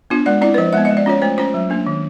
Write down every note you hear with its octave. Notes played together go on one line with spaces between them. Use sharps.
B3 D4 F4
G#3 D5
C4 E4 D5
B4
F3 C5
G#3 B3 E5
D#5
G#3
D5
C#4 F4 C#5
A3 C5
C#4 F4 C5
F#3
A#3 D4
D#3